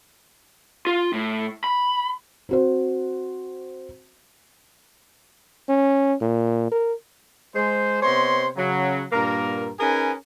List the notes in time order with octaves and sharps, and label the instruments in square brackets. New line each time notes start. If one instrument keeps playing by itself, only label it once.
[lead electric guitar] F4
A2
B5
[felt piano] C4 F#4 C5
[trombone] C#4
A#2
A#4
[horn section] G#3 C5
C3 B3 C5 C#5 D#5 C6
C#3 F#3
G2 A#2 A#3 A#4
C#4 D#4 G#4 A#4 B4 G#5